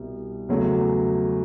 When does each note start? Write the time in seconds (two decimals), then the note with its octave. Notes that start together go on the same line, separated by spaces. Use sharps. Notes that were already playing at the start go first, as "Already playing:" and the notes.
Already playing: C2 B2
0.49 E2 C#3 F#3 A3